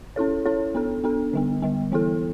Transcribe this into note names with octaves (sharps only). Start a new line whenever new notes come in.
C#4 E4 A4 C#5
C#4 E4 A4 C#5
B3 D4 A4
B3 D4 A4
D3 G3 B3
D3 G3 B3
E3 B3 E4 A4